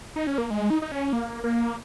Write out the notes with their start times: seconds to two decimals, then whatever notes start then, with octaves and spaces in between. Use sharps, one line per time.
0.16 D#4
0.27 C#4
0.38 A#3
0.50 G#3
0.70 D#4
0.82 D#4
0.92 C#4
1.13 A#3
1.44 A#3